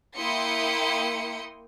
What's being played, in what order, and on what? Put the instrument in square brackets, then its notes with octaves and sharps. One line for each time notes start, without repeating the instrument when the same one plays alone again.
[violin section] A#3 E4 G5 C6 D#6 C#7